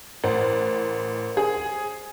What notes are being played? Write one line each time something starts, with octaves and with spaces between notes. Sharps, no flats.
A1 A#4 C5
G#4